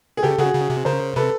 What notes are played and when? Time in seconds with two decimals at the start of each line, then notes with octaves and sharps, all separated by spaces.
0.17 G#4
0.23 C#3 G4 A4
0.39 C#3 F#4 G#4
0.54 C#3
0.70 C3
0.85 C#3 A#4 C5
1.16 C3 A4 B4